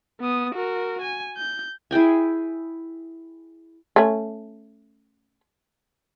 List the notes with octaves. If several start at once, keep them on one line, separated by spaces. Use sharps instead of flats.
B3 D#6
F#4 A#4
G#5
G6
E4 G#4 G5 G#5
A3 C#4